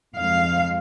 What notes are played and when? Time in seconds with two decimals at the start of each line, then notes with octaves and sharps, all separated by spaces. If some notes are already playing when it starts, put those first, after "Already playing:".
0.16 F2 F3 G#3 F5